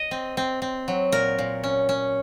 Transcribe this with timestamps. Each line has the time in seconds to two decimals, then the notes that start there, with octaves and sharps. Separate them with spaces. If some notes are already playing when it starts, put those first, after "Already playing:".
Already playing: D#5
0.11 C4
0.37 C4
0.62 C4
0.88 F#3
1.12 A#2 A#4
1.38 A#2
1.64 C#4
1.89 C#4